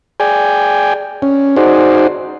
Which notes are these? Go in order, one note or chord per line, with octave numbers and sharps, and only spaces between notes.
G#4 D5 G5 G#5
C#4
D#4 F#4 G#4 C5 D5